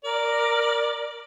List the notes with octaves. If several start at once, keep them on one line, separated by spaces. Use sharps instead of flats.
A#4 D5